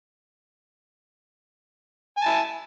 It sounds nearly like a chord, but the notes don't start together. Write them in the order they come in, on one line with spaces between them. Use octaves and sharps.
G#5 A5 E4